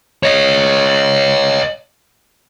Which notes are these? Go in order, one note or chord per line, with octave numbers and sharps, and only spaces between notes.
C#5 D#5